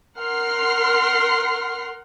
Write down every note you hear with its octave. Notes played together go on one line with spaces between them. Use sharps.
A#4 F#5 C6 F6 C7